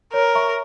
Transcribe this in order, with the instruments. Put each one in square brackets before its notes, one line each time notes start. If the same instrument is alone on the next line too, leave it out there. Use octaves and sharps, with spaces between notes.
[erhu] A#4 [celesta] C#5
[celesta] E5 A#5 C#6